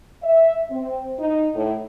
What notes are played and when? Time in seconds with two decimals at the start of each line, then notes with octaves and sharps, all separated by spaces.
0.23 E5
0.71 C4
1.19 D#4
1.55 A2